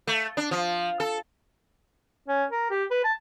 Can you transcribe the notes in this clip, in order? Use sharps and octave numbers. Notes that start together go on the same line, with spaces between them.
A3
D4
F3
A4
C#4
A#4
G4
B4
A5